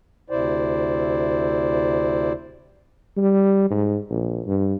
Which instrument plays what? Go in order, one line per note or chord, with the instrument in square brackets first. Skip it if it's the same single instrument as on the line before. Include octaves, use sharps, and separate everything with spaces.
[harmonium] D2 C3 E4 C5 D5
[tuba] G3
G#2
A#1
G2